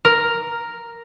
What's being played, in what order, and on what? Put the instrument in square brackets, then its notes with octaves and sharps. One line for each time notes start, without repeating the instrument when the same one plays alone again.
[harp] A#4